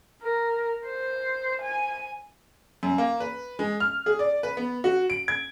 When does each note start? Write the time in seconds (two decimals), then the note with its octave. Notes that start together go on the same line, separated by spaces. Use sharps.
0.23 A#4
0.86 C5
1.62 G#5
2.83 F#2
2.98 A#3
3.20 B4
3.59 G#3
3.80 F6
4.06 G#4
4.19 D5
4.43 B4
4.57 B3
4.84 F#4
5.10 D7
5.28 G#6